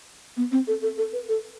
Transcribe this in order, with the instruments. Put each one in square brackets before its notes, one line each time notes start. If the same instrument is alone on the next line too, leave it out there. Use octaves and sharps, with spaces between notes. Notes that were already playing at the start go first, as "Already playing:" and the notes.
[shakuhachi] B3
C4
A4
A4
A4
B4
A4